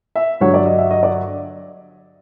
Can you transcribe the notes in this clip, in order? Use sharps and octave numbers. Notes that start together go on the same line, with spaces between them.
E5
G2 D3 F#3 C#5
D5
D#5
E5
D#5
D5